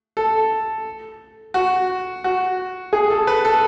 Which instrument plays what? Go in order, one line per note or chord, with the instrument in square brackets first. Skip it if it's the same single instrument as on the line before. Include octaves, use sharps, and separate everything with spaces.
[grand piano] A4
F#4
F#4
G#4
A4
B4
A4